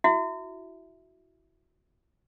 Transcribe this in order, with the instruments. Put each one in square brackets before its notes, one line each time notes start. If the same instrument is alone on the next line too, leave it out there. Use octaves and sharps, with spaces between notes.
[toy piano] E4 F#4 E5